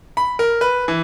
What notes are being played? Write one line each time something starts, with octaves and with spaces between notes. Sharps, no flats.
B5
A#4
B4
E3